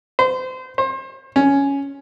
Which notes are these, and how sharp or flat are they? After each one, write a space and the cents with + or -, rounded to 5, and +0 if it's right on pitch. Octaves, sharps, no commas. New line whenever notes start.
C5 -30
C5 +30
C#4 +5